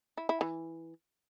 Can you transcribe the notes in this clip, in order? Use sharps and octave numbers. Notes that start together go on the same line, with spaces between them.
E4
E4
E3